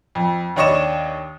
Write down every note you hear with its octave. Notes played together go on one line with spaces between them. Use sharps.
F2
D#2 D4 C#5 D#5 C#6 E7